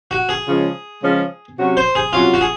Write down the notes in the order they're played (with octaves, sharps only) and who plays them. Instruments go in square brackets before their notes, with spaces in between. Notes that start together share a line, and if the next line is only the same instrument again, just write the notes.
[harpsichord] F#4
G#4
[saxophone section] C#3 F3 G#3 C#4 F4
C#3 F3 G#3 C#4 F4
C3 F#3 C#4 F#4
[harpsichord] C5
G#4
[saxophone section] C3 F#3 C#4 F#4 [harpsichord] F4
[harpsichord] F#4
G#4